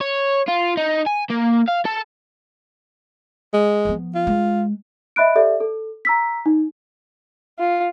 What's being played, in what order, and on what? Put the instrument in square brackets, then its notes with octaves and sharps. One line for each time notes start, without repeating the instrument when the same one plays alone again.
[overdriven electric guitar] C#5
F4
D#4
G#5
A#3
F5
A4
[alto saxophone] G#3
[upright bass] F3 B3
[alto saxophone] F4
[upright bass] G#3
[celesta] D#5 E5 B5 F#6 D7
G4 A4 D5 E5
A4
A#5 E6 B6
D#4
[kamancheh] F4